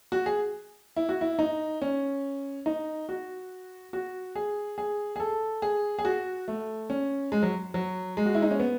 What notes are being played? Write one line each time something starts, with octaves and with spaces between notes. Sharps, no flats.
F#4
G#4
E4
F#4
E4
D#4
C#4
D#4
F#4
F#4
G#4
G#4
G#4
A4
G#4
G#4
F#4
A3
C#4
G#3
F#3
F#3
G#3
F#4
E4
D#4
C#4
B3